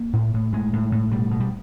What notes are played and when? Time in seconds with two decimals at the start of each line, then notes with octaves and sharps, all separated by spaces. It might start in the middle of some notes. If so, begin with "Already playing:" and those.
Already playing: A#3
0.13 A2
0.34 A2
0.52 A2 G#3
0.73 A2
0.92 A2
1.11 B2 G3
1.31 B2
1.40 G3